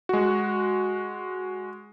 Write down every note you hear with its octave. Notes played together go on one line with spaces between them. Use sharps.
G#3 F#4